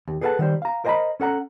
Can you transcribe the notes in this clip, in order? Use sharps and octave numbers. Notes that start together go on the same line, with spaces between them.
D#2
G#4 A4 B4 D5 F#5 A5
D#3 G3 C5
F5 A#5
A#4 C5 D#5 G5 A#5 B5
C#4 A4 F#5 A#5